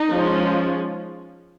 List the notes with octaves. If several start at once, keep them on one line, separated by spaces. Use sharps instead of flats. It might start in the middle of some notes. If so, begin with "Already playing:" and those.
Already playing: D#4
F3 G#3 C#4